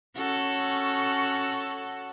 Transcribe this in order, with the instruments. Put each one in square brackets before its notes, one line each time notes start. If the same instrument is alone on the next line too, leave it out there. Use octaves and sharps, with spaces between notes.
[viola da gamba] C#4 F#4 A4